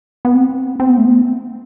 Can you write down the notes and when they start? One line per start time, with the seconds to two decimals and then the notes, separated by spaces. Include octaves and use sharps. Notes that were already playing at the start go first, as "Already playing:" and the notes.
0.25 B3
0.34 C4
0.80 C4
0.89 B3
0.98 A3
1.05 B3